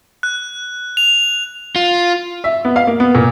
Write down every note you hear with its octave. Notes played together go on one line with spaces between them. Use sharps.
F#6
F7
F4
E5
B3
F5
A#3
B3
A#2